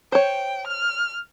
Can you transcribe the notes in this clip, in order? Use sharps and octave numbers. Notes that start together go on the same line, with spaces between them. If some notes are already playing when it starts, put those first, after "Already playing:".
C5 C#5 G5
F6